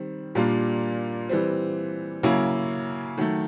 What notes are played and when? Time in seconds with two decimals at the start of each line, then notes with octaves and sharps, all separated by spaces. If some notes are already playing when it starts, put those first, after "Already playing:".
Already playing: D#3 G3 C4
0.35 A#2 G3 A#3 D4 F4
1.29 E3 G3 C4
2.23 C#3 F#3 A#3 C#4 E4
3.18 D#3 F#3 A3